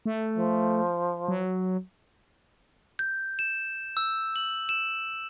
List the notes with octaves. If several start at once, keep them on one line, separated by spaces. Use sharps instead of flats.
A3
F3
F#3
G6
E7
E6
F#7
E7